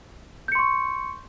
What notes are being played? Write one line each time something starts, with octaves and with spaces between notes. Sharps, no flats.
C6 C#6 G6 C#7